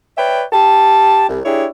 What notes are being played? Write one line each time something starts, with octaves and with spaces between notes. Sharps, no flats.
B4 C#5 D5 E5 G5
G4 A5
C2
D4 E4 G4 G#4 C#5